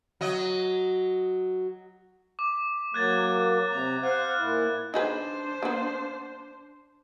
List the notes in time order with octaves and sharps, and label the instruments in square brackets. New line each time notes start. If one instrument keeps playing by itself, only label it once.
[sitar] F#3 D#5
[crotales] D6
[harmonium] F#3 A#3 [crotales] F#6 G#6 A6
[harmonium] C3 A#5
[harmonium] C5 F5 F#5 [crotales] F#6
[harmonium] A#2 E4
[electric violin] D4 C5 [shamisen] D#4 G#4 B4
[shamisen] A#3 B3